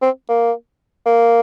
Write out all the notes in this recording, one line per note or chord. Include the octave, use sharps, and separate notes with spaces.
C4
A#3
A#3